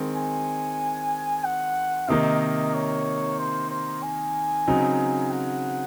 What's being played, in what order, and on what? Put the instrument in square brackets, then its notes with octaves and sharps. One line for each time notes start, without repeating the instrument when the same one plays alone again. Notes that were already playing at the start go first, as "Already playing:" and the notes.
Already playing: [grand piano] D#3 G#3 C4
[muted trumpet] G#5
F#5
[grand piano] C3 D#3 A#3 D#4 [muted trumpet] D#5
[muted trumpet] D#5
C#5
C5
C5
G#5
[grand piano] C#3 F#3 C4 D#4
[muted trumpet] F#5